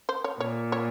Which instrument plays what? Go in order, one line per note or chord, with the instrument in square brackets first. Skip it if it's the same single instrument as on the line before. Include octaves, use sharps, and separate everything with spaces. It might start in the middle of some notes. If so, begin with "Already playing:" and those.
[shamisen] C5
C#5
[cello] A#2 [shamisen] C#5
[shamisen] C#5